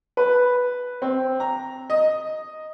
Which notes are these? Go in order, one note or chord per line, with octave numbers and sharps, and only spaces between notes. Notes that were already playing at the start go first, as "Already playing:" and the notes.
B4
C4
A#5
D#5